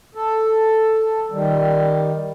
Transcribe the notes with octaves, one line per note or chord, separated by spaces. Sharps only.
A4
D#3 G3